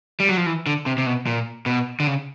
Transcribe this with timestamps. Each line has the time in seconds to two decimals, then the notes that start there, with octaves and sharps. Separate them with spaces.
0.20 G3
0.29 F#3
0.37 F3
0.46 E3
0.66 D3
0.86 C3
0.98 C3
1.06 B2
1.27 A#2
1.66 B2
2.00 D3
2.07 C#3